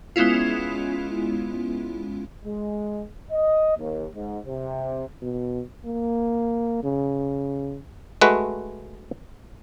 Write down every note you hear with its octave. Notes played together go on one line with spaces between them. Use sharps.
G#3 B3 C#4 E4 F4
G#3
D#5
D#2
G#2
C3
B2
A#3
C#3
G#3 A3 F#4 B4